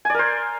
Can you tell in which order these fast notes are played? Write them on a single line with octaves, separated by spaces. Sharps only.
G#5 D5 A#4 C5